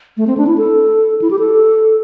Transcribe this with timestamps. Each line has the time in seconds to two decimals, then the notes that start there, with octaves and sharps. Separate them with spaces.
0.17 A3
0.27 C4
0.37 D4
0.47 E4
0.58 A4
1.22 E4
1.31 G4
1.39 A4